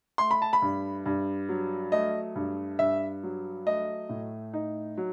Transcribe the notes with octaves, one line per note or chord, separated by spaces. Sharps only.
A3 C6
B5
A5
B5
G2
G2
F#3
A3 D#5
G2
G2 E5
F#3
A3 D#5
A2
D#4
F#3